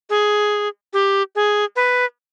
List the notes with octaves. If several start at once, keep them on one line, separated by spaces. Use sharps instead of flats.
G#4
G4
G#4
B4